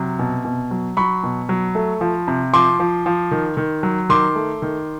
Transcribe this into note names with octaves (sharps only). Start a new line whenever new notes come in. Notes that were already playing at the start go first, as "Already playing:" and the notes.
Already playing: C3 F#3
B2
B2
F#3
F#3 B5 C#6
B2
F#3
A3
F3
C3
F3 C6 D6
F3
F3
D#3
D#3
F#3
D#3 C6 D6
A3
D#3